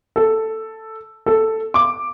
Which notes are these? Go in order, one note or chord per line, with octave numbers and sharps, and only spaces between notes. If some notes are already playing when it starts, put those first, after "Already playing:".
A4
A4
D6